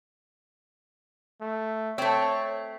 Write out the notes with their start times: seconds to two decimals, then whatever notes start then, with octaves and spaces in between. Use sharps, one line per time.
1.41 A3
1.98 A3 C4 C#5